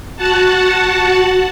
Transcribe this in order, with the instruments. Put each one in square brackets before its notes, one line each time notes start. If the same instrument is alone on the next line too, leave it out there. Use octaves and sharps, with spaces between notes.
[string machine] F#4 F#5 A5